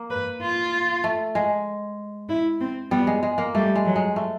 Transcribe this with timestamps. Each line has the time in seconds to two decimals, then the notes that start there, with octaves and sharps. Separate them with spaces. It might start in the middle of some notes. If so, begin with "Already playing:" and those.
Already playing: A#3
0.11 B4
0.42 F4
1.04 A3
1.35 G#3
2.29 E4
2.61 C4
2.91 G3 B3
3.07 G#3
3.23 G#3
3.38 A#3
3.54 G3 A3
3.75 G#3
3.86 F#3
3.96 G#3
4.16 A3